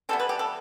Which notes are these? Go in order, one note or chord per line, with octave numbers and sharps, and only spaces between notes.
E3 G3 B3 A4
B4
G4
A4